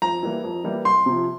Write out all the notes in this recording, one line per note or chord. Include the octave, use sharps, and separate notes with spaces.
F2 A#5
E3 G3 A#3 E4
F2
E3 G3 A#3 E4
C2 C6
C3 F3